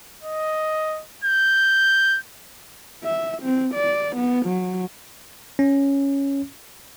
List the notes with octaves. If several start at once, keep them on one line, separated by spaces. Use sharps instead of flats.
D#5
G6
E5
C4
D5
B3
F#3
C#4